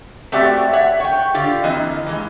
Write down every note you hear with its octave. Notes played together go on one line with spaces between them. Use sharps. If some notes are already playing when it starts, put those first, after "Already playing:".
A3 C4 F#4 G4 D5 E5
C#5 E5 F#5
C#5 G5
D3 F4 G4
E3 A#3 C4 D#5
E3 G#3